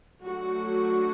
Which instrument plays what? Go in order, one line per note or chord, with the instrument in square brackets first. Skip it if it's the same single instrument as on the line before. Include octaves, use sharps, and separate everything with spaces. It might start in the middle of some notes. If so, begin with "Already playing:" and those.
[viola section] F#3 A3 D4 F#4